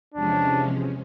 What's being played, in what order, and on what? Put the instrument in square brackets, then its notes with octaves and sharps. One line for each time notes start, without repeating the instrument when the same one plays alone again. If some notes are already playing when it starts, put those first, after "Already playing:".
[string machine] E2 C3 F3 G#3 C#4 [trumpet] D4